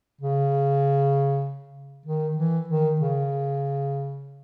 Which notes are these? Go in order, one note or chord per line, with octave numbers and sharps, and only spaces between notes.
C#3
D#3
E3
D#3
C#3